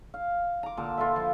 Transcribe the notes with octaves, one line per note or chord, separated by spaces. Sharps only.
F5
A#5 D6
A#2 D3 A5
F4 A4 B4 E5
F3